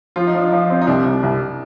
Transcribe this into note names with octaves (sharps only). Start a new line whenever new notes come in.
F3 F4
D#4
F3 D4
D#4
F3
C4
D#4
C2 D4
C2
C2